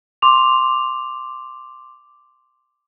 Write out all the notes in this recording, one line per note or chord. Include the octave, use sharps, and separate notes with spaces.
C6 D6 F7